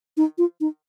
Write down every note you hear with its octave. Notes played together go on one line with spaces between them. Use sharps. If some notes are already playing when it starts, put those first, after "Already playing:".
D#4
F4
D#4